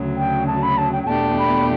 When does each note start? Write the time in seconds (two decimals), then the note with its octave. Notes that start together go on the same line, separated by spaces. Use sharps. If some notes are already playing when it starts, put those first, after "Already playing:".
Already playing: D2 C#3 F#3
0.17 G5
0.47 A5
0.63 B5
0.78 A5
0.93 G5
1.03 G5
1.07 E2 B2 A3 D4 G4 A5
1.39 B5